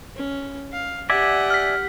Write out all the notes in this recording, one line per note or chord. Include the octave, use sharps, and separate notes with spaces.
C#4
F5
G4 D5 E5 F#5 G#5
F6 B6